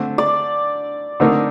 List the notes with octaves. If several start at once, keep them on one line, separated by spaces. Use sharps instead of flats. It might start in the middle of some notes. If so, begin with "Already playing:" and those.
Already playing: D3 A3 C4
D5
D3 A3 C4 D#4 A#4